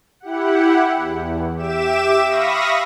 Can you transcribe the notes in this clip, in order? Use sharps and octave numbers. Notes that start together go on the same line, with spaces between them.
E4 G4 F#5
E2
G4 E5 D6 E7
E5 F5 B5 C#6 D#6 A#6